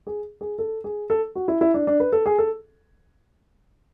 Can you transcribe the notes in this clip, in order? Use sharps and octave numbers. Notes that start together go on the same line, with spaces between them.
G#4
G#4
A4
G#4
A4
F#4
E4
E4
D4
D4
B4
A4
G#4
A4